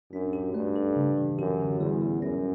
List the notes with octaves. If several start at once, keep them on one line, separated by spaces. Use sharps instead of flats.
F#2 D4
G4
G2 A3
A4
C#3
E3
F#2 G4
D3
E2 G3
G3
F#2 C#4